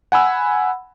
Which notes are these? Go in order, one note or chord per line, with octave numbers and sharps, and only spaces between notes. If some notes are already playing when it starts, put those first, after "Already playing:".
F#5 G#5 B5 E6